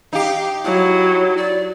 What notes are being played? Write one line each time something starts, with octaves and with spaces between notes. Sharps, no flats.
D#4 G4 F5
F#3 E4
D5